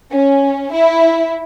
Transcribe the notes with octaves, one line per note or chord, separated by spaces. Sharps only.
C#4
E4